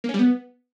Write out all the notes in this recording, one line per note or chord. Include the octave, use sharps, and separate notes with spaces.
A#3
C#4
G3
B3